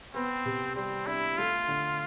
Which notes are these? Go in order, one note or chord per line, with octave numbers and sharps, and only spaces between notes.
B3 C4
C3
G3 C4
D4 E4
A3 F4
D3